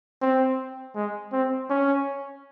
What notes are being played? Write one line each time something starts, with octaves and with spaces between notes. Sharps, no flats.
C4
G#3
C4
C#4